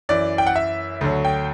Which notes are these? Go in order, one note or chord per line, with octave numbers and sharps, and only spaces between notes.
F#2 E3 D5
G5
F#5
E5
D2 D3 F#3
G5